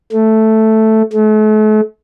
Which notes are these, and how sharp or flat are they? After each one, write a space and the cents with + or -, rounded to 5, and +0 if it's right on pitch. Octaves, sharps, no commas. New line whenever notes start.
A3 +0
A3 -40